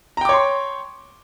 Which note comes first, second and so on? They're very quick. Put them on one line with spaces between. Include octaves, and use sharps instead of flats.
A#5 G5 D6 C#5 C6